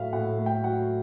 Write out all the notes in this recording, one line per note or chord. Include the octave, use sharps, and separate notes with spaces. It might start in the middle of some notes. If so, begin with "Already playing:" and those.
Already playing: A2 F#3 E5 F5
A2 F#5
A3
G5
F#3 F#5